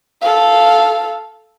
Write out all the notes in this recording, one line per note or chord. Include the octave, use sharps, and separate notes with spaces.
A4 F5